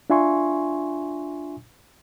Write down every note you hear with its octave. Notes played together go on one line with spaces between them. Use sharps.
D4 F4 E5 G#5 C6 C#6